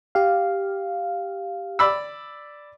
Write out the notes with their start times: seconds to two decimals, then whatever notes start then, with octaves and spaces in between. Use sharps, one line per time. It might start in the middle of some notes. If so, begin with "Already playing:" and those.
0.15 G4 F5
1.79 D5 B5 E6